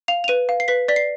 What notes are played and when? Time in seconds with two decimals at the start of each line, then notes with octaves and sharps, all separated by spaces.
0.08 F5 F7
0.24 F7
0.28 B4 D#7
0.49 F5
0.60 C7
0.68 B4 B6
0.88 D5 B6
0.96 C7